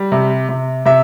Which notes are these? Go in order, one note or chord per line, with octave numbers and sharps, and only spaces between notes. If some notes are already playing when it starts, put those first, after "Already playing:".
Already playing: G3
C3
C3
C3 E5